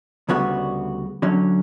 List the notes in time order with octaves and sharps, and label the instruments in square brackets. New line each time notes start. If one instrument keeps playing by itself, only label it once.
[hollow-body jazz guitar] D2 C#3 G3 B3 F#4
D3 F#3 C#4